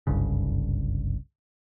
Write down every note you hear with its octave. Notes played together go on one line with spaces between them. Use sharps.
F#1 C2 G2 C#3